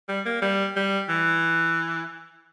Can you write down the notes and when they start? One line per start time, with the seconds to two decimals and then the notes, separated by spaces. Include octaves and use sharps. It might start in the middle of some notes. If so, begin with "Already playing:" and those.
0.08 G3
0.25 A#3
0.42 G3
0.76 G3
1.09 E3